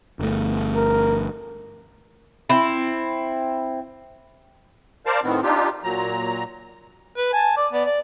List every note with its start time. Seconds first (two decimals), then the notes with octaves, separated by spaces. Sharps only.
0.19 G1 A3
0.75 A#4
2.49 C4 E4
5.06 A#4 C5 D5 F5 A5
5.23 A2 D#3 B3 C4
5.43 D4 D#4 F4 G4
5.84 A#2 F#3 A#5
7.17 B4
7.33 G#5 A5
7.57 D5 D6
7.72 B3 D5
7.85 D5